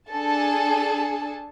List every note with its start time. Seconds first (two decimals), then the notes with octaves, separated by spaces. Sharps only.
0.11 D4 G#4 A4 G#5 A5